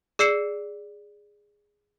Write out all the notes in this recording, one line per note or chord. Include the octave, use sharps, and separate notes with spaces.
G#4 D5 E6 C7 C#7 E7